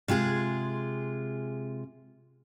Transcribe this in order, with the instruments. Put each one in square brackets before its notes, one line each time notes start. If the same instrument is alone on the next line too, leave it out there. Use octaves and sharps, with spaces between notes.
[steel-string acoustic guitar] C3 G#3 F4 G#4